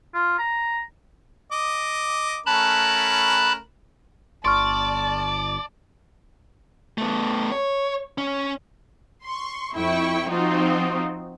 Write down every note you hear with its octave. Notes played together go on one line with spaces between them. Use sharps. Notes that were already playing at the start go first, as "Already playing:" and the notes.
F4
A#5
D#5 D6
A3 C#4 A#4 A5 B5 F#6
G1 D5 A5 C6 C#6 F6
A3 B3
C#5
C#4
C6 C#6
F2 E4 G5 C#6
F3 C4 D#4 F4 F#4